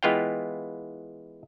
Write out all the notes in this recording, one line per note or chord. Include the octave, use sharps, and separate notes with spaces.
E3 G#3 B3 F4 F5 G5